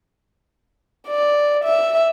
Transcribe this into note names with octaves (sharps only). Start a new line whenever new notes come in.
D5
E5